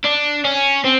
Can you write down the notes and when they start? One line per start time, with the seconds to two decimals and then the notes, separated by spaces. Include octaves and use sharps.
0.05 D4
0.45 C#4
0.84 C4